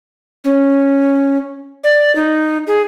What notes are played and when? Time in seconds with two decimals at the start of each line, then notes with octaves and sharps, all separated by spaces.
0.44 C#4
1.84 D5
2.15 D#4
2.67 G#4